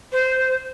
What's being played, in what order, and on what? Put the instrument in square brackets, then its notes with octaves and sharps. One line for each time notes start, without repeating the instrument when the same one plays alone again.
[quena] C5